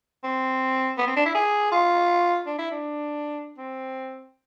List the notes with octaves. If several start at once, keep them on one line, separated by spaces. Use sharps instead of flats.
C4
B3
C4
D4
E4
G#4
F4
D4
E4
D4
C4